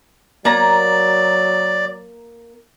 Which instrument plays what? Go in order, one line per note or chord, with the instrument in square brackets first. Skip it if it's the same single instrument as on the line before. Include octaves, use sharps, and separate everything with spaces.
[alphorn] F#3 [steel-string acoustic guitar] A#3 A#5 [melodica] D5